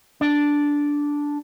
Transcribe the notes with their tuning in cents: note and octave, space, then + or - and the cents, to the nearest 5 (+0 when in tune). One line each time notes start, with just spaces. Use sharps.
D4 -5